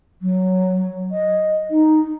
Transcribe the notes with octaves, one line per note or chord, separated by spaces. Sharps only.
F#3
D#5
D#4